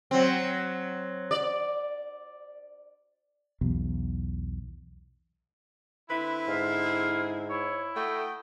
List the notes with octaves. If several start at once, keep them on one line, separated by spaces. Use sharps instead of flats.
F#3 C4
D5
B1 E2 B2
D3 C4 E4 B4 B5
G#2 F5
G#4
E4 C#5
A3 F#4 D#5 G5